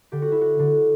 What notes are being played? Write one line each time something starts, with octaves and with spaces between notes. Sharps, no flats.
D3 G4
F#4
E4
F#4
D3